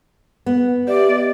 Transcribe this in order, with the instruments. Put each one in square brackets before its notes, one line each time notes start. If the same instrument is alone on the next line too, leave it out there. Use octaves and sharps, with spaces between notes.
[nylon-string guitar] B3
[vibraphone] G4 E5 [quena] D5
[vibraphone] D#5